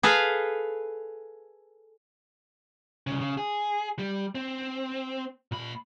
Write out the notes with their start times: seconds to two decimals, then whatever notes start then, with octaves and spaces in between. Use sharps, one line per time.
0.03 G#4 A4 B4 F5
3.07 C2 C#3
3.21 C#3
3.38 G#4
3.99 G3
4.35 C4
5.52 A#2 B5